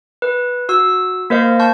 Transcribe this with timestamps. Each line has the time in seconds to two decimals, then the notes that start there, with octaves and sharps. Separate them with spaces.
0.22 B4
0.69 F#4 E6
1.30 A#3 A#4 C5 D#5 F5
1.60 A5 C#6 G6